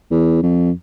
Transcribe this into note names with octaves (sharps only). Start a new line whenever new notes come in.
E2
F2